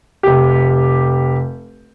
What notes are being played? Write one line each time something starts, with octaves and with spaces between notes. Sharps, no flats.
F1 G4